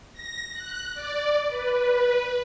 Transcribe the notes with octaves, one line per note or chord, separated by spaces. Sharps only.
A#6
F#6
D5
B4